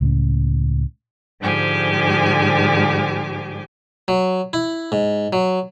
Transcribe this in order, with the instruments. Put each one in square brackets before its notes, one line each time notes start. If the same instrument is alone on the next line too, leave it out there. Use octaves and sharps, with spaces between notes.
[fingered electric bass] C#2 A2 C#4
[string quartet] G#2 D3 F3 G4 G#5
[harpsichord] F#3
E4
G#2
F#3